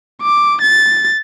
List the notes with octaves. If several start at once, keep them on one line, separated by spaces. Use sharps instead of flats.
D6
A6